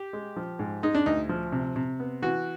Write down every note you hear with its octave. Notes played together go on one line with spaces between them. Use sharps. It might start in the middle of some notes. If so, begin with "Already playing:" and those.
Already playing: G4
G#3
F3
G#2
G#3 D#4
D4
D2 D#4
F3
C3
C3
B3
E3 F#4